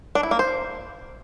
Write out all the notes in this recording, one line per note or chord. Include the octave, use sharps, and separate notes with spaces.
D4
E4
A#3
C5